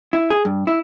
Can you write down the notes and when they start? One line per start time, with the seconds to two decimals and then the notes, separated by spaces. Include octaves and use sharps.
0.13 E4
0.30 G#4
0.45 G2
0.67 E4